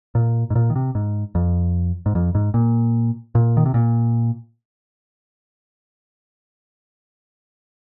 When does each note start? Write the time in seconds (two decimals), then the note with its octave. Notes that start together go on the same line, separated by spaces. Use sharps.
0.15 A#2
0.50 G#2
0.55 A#2
0.70 D#3
0.76 C3
0.95 G#2
1.35 F2
2.06 G#2
2.15 F2
2.35 G#2
2.54 A#2
3.35 A#2
3.57 D#3
3.66 C3
3.74 A#2